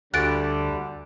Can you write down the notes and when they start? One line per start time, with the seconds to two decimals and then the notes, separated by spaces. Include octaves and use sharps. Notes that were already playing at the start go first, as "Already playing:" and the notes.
0.14 D2 D3 G3 F#6 A6 D7